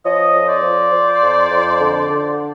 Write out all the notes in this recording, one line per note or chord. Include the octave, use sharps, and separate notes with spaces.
F3 C#5 D#5
F2
C5 D5
F3
F3
F2
F2
D3
D3